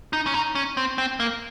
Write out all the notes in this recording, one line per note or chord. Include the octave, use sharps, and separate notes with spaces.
D#4
C#4
D#4
C#4
C4
C4
A#3